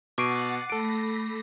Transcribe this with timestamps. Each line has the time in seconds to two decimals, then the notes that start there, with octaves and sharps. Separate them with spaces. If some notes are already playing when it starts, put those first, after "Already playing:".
0.18 B2 F#5 C#6 D6 A6 C7 D7 D#7
0.70 A3 A4 B5 A#6 D7